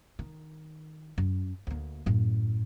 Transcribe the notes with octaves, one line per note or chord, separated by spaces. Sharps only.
D#3
F#2
D2 A#3
F#2 A2